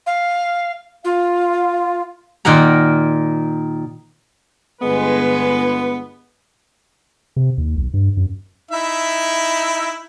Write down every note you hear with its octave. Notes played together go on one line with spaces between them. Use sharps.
F5
F4 F5
A#2 D#3 A#4 F#5 A#5
G1 G#3 B3 B4
C3
D#2
B1
G2
F#2
D#4 E4 E5